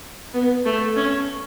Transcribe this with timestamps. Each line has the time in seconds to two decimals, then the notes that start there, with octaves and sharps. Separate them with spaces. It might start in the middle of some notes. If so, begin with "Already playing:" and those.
0.34 B3
0.66 A3
0.96 C#4